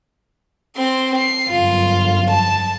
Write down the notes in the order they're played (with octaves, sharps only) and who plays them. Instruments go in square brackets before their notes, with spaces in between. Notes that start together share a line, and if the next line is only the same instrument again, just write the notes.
[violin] C4 C6
C7
[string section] G1 F#2 [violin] F4
[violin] A5